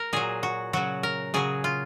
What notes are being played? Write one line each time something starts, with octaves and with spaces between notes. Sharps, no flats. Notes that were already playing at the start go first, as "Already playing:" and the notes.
Already playing: A#4
A#2 F#3 G#4
F#4
C#3 F#3 F#4
A#4
C#3 F#3 G#4
F4